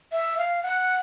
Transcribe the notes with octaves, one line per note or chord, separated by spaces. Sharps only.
E5
F5
F#5